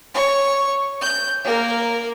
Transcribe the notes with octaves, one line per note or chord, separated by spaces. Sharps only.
C#5 C#6
G6
A#3 A#4